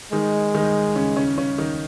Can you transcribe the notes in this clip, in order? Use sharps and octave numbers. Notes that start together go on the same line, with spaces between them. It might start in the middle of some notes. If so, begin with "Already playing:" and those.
D#3 G#3 D#4
D#3 D#4
C#3 C#4
C#3 C#4
C#3 C#4
D#3 D#4